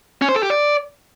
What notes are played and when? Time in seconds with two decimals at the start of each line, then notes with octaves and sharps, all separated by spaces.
0.22 C#4
0.29 C5
0.36 A4
0.43 G4
0.50 D5